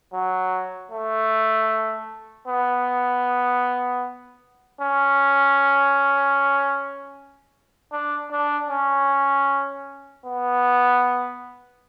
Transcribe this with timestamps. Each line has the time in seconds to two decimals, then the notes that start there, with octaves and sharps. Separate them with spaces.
0.14 F#3
0.91 A3
2.48 B3
4.81 C#4
7.92 D4
8.31 D4
8.70 C#4
10.26 B3